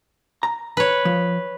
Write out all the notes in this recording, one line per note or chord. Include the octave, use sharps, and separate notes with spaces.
A#5
B4 C#5
F3